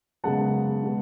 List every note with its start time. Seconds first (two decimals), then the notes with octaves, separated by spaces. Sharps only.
0.24 F#2 C#3 G#3 B3 F#5 A5
0.83 B2 G#3 B3